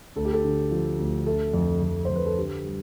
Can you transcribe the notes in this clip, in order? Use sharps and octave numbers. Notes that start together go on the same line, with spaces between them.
D2 A4
G4
A4
D3
F3
D2
A3 A4
F2
F2
F2 C5
B4
A4
D3 G4
G3